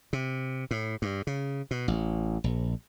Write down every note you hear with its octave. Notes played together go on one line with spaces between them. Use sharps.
C3
A2
G2
C#3
B2
A1
A#1